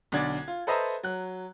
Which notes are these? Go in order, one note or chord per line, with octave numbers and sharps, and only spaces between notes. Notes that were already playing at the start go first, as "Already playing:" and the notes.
B1 D3 D5 G#6
F4
A4 B4 C5 D#5 E5 A#5
F#3 F#6